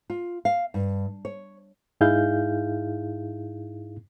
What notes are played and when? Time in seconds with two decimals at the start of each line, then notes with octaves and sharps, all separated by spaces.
0.10 F4
0.45 F5
0.74 G2
1.25 C#5
2.01 G#2 D#4 E4 G#4 F5 G6